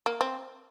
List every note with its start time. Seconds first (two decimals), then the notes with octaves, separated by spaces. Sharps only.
0.06 A#3
0.21 C4